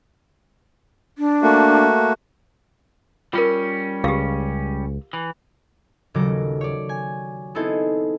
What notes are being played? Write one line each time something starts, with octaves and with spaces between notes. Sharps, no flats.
D4
A3 A#3 F#4
G3 C#4 F4 A#4
C#2 G4 F5
E3
D#1 C#3 F#3 A4 D6 A#6
C#5 D5
G#5
B3 C4 D#4 E4 G#4 A4